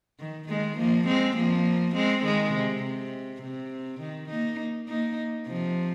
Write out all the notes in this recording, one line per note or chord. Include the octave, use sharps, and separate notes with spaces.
D#3
D#3 G#3
F3 A#3
G#3 C4
F3 A#3
G#3 C4
D#3 G#3
C3
C3
C3
D#3
A#3 D#4
A#3 D#4
C3 F3